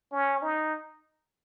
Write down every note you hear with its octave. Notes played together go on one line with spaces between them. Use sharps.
C#4
D#4